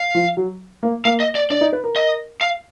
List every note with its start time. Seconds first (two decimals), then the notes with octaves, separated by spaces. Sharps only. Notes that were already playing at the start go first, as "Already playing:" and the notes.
Already playing: F5
0.15 F3
0.37 F#3
0.83 A#3
1.05 A#3 F5
1.20 D#5
1.35 D5
1.50 D4 D5
1.61 D#4
1.73 B4
1.84 A#4
1.96 D#5
2.41 F5